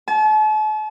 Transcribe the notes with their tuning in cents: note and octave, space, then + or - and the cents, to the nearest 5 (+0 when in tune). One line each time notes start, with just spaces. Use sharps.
A5 -40